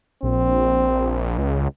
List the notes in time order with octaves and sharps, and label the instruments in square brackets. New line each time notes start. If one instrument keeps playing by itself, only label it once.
[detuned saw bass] A#1 [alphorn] C4
[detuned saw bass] C#2